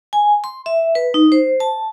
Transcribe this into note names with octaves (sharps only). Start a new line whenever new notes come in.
G#5
C6
E5
B4
D#4
C5
A5